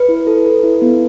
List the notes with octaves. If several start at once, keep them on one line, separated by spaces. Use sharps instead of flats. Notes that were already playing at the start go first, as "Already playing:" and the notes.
Already playing: B4
E4
A4
A4
E4
B3